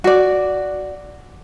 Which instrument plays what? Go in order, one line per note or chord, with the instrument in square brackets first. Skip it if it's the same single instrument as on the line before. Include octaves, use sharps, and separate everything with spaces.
[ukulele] F#4 D5